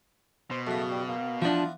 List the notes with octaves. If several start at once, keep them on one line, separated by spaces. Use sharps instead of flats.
B2 C5
F#2 C#3 A3
G3
A#3
E3 F3 B3 D4 F4